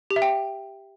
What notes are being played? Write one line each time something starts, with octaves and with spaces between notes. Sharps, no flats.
G4
E5
G5